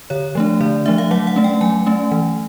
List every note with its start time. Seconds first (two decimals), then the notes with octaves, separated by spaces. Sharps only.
0.10 D3 C#5
0.35 F3 A3 D4
0.60 D3 D5
0.86 F3 A3 D4 E5
0.98 F5
1.11 F#3 F#5
1.27 F#5
1.36 A3 C#4
1.44 G5
1.61 F#3 G#5
1.86 A3 C#4
2.12 E3